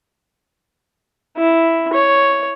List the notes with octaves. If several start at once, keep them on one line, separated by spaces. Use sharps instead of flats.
E4
C#5